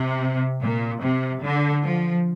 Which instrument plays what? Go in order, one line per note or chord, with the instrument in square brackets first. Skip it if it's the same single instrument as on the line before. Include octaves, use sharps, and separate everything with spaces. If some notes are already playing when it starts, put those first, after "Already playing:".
Already playing: [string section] C3
A#2
C3
D3
F3